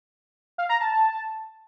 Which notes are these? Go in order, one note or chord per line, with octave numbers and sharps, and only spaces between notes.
F5
A#5
A5